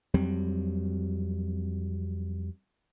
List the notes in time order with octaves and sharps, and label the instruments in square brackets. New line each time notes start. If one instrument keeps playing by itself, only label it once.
[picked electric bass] F2 F#3 G3 C4